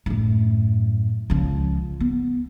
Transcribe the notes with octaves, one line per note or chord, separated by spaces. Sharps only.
F#2 A2
C#2 F3
B3